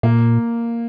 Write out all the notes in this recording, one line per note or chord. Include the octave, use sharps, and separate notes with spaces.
A#2 A#3